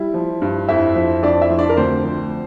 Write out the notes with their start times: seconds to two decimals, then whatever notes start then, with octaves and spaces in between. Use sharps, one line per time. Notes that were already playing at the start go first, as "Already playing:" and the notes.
Already playing: G3 E4
0.14 F3
0.42 G2
0.68 F2 E4 E5
0.96 F3
1.23 F2 D4 D5
1.41 E4 E5
1.50 F3
1.59 D4 D5
1.69 A#4
1.77 D2 C4 C5
2.04 F3